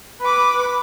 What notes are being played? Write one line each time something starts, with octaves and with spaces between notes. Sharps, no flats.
B4 B5 D6